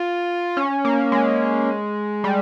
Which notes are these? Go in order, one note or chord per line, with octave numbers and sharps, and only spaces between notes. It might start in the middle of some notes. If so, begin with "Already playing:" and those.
Already playing: F4
C#4
A#3
G#3
G3